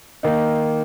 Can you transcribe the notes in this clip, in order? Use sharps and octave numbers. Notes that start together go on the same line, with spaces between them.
D#3 A#3 D#4